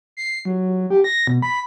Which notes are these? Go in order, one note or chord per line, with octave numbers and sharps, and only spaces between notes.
C7
F#3
G4
A#6
B2
B5